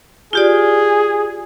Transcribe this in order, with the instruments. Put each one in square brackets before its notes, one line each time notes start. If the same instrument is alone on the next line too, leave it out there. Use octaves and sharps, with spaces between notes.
[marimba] F4 G4 D5 [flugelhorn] G#4